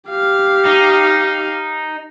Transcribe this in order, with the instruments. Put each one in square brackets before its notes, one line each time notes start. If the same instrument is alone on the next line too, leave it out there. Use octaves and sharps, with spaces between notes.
[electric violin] G4 F5
[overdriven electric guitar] D#4